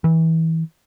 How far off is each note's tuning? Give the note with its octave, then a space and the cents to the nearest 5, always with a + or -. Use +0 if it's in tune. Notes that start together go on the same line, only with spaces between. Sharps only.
E3 -25